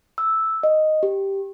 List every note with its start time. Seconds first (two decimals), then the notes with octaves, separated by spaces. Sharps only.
0.18 E6
0.63 D#5
1.03 G4